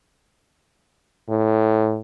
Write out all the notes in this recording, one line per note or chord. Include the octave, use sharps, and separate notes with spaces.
A2